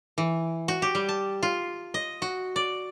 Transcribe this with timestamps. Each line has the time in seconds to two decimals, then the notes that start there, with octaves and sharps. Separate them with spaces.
0.18 E3
0.68 F#4
0.82 G4
0.95 G3
1.09 A5
1.43 F4
1.94 D#5
2.22 F#4
2.56 D5